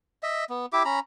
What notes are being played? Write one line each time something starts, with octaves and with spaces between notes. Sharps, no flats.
D#5 E5
B3
E4 G4 E5 D6
C#4 A#5 B5